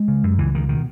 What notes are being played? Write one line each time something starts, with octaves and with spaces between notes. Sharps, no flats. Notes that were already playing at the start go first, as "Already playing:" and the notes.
Already playing: G#3
C#3
F#2
C#2 E3
C#2 D#3
B2 D#3